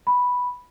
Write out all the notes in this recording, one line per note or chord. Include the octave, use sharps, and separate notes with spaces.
B5